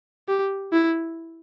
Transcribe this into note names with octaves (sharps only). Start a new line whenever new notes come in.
G4
E4